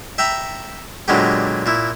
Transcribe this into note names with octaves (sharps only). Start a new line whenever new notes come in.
E5 G5 A#5 B5
A#2 D3 F#3 G#3 B3 G4
A#2 E4